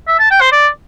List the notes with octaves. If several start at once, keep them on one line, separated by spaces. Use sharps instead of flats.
E5
A5
G5
C5
D5